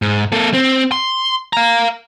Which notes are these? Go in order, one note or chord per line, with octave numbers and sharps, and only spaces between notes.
G#2
A#3 A4
C4
C6
F5 A#5